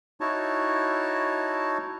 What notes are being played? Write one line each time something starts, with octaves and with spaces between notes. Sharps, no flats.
D#4 E4 F#4 C#5 A5